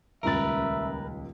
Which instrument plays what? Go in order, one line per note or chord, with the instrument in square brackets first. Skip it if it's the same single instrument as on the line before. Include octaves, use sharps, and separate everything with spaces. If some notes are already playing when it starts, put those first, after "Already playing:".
[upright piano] D#1 C#2 A6 [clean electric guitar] A#4 B4 [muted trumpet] E5